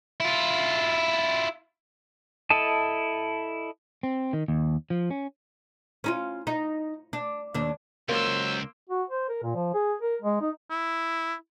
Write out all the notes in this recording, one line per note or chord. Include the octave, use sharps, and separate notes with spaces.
E4 F4
E4 A4 D#5 A5
C4
D#3
D#2
F3
C#4
C#4 D#4 F4
D#4
D4
D#2 D4
C#2 F#3 A#3 C5 C6 E6
F#4
C5
A#4
A#2
F3
G#4
A#4
G#3
D#4
E4